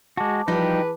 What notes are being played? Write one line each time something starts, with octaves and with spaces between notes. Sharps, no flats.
G#3 F#4 A5 D6
E3 F3 G3 D#4 G4 G#4 B4